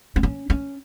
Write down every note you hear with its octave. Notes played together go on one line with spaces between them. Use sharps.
C4
C#4
C#4